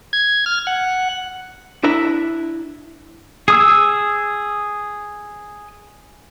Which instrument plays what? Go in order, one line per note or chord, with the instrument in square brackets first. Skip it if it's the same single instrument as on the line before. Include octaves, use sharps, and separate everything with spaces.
[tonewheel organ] G#6
F6
F#5
[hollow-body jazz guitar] D4 E4 E5 A#5
[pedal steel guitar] G#4 D#6 E6